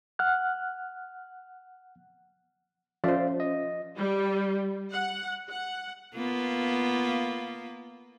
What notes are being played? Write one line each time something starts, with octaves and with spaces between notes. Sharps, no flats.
F#5 F6 F#6
F3 C#4 C5 D5 E5 F5
D#5
G3
F#5
F#5
A#3 B3 F4